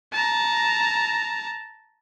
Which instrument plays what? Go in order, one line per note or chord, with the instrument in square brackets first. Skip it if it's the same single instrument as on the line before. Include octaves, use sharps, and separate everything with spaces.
[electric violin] A5 A#5